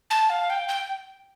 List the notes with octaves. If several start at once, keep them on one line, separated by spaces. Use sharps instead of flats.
A5
F5
G5
G5